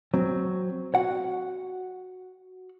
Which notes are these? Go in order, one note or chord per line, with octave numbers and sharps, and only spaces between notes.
F#3 C4
F#4 F#5